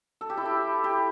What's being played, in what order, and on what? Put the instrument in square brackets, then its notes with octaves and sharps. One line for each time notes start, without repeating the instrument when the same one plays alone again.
[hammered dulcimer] A4
G4
E4
G4
G4